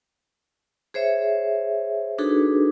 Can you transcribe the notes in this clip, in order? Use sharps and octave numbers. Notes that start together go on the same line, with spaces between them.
G#4 C5 C#5 E5
D4 D#4 F#4 G#4 A4 B4